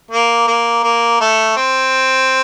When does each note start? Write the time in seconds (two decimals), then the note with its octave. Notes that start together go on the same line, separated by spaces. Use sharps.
0.11 A#3
0.47 A#3
0.84 A#3
1.21 A3
1.57 C4